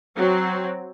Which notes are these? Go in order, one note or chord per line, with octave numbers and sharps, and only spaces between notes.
F#3 C4